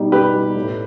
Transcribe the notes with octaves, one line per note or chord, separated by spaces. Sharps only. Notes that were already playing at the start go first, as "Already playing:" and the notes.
Already playing: B2 G3 D#4
B2 G4 B4
G3 D#4
A2